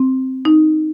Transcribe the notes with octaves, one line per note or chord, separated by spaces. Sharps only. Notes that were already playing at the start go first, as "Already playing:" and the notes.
Already playing: C4
D#4